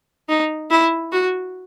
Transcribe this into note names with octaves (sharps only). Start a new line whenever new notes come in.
D#4
E4
F#4